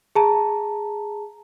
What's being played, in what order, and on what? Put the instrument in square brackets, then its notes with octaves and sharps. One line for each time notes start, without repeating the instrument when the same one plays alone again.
[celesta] G#4 A5 A#5